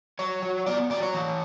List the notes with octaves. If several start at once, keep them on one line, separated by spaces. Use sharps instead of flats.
F#3 C#5
F#3
B3 D5
F#3 D5
C#5
E3